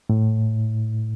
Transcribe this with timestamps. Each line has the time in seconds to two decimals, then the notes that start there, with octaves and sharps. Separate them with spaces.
0.10 A2